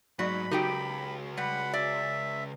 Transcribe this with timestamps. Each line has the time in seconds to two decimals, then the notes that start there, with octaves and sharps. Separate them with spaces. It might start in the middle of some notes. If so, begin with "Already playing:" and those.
0.19 G#2 F#3 F#4 D5 B5 B6
0.51 C#2 D#4 F#4 G4 G5
1.37 G3 F#5 B5
1.73 D5 E5